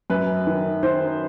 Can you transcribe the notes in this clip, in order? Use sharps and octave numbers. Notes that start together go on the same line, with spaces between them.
F#2 B4
D#3
D#3 C5